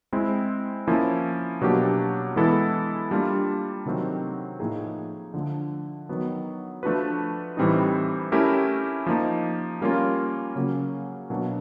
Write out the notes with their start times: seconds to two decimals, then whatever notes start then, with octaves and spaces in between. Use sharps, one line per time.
0.13 G#3 C4 E4
0.87 F3 A#3 C#4 E4
1.61 B2 F#3 A#3 D4 G4
2.36 E3 G#3 B3 E4 A4
3.11 G3 A#3 D4 F4
3.86 C3 D#3 F#3 A3 C4
4.60 A2 F3 A#3 D#4 G#4
5.34 D3 F3 A3
6.09 D#3 F#3 B3
6.83 F3 A3 D4 F#4 B4
7.57 A2 E3 G3 C4 D#4
8.32 A3 C#4 E4 G4 A#4
9.06 F3 A#3 D#4
9.81 G3 A#3 C#4 F4 A#4
10.56 C#3 F#3 A#3 C#4
11.30 B2 F#3 A#3 D4